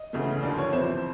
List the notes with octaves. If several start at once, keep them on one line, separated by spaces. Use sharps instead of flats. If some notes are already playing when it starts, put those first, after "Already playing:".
Already playing: D#5
D2 C#3 E3 A3
D#2 D3 F3 D5
C#5
F2 C3 E3 C5